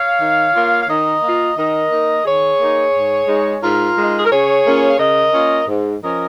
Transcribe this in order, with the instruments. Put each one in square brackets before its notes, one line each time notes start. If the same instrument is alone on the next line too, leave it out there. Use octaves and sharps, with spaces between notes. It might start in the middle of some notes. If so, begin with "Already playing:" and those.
Already playing: [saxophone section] C#5 F5
D#3
A#3 F4
F5
D#3 A#4 D#5
A#3 F4
D#3 A#4 D#5
A#3 D#4
D#3 G#4 C#5
A#3 D#4
G#2
G#3 D#4
G#2 F4 A#4
G#3 D#4
G#4
A#4
C#3 G#4 C#5
A#3 C#4 F4
F5
C#3 A#4 D#5
A#3 C#4 F4
G#2
F3 C#4 F4 A#4 D#5